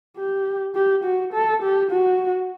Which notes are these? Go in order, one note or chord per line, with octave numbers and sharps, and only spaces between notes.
G4
G4
F#4
A4
G4
F#4